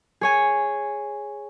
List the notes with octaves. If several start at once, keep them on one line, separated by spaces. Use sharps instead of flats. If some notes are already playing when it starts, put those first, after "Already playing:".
G#4 C#5 G#5